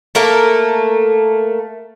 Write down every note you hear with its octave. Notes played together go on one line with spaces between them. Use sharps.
A3 A#3 A#4